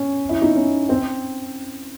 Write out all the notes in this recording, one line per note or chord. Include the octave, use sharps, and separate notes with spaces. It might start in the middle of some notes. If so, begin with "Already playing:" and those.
Already playing: C#4
E4
D#4
C#4
C4